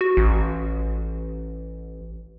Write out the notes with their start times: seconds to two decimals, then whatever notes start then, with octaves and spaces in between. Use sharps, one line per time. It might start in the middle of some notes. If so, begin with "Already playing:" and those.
0.01 F#4
0.17 A1